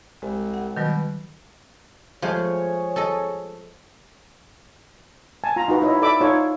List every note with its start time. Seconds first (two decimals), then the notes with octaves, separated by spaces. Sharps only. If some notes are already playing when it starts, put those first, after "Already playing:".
0.22 C2 G#3
0.54 F#5
0.77 B2 D#3 F#3 G3
2.22 F3 G#3 A3 G#4 C#5
2.96 A4 D#5
5.44 G#5 A5
5.56 F4 A#5
5.68 D#4 F#4 B4
5.81 D#4 E4 C#5 D#5
6.02 A4 D5 E5 B5 D6
6.20 D#4 F4 A4 C#5